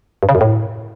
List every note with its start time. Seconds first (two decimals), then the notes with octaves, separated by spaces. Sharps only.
0.23 G2
0.29 C#3
0.35 F#2
0.41 A2